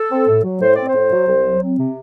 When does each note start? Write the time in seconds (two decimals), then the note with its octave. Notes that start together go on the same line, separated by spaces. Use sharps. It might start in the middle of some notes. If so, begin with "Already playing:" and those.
Already playing: A4
0.10 C4
0.27 A2
0.44 F#3
0.61 A2 C5
0.74 C4 D5
0.87 C5
0.95 A2
1.11 F#3
1.28 C2
1.45 F#3
1.62 C4
1.78 C3